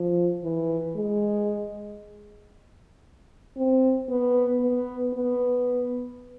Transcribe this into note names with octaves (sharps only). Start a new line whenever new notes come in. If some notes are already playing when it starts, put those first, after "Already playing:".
Already playing: F3
E3
G#3
C4
B3
B3
B3